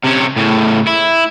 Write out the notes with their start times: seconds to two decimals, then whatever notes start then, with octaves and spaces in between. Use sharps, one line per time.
0.04 C3 C#4
0.37 A2 C#3
0.88 E4